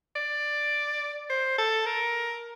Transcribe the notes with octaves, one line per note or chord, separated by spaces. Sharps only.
D5
C5
A4
A#4